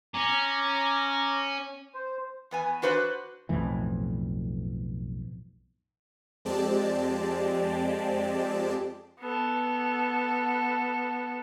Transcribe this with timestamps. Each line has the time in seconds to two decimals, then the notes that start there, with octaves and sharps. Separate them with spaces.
0.14 C#4 A#5 D6
1.95 C5
2.51 E2 B3 G#5
2.82 D4 F#4 B4 C5 F5 F#5
3.49 B1 F2 A2 E3
6.45 F2 G#3 C4 G4 D5 A5
9.21 B3 A4